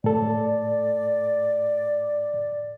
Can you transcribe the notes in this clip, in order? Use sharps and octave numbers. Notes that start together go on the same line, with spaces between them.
A2 A4 D5